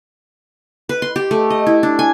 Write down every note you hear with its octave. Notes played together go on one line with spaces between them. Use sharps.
B4
C6
G4
A3
D#5
E4
D4
G#5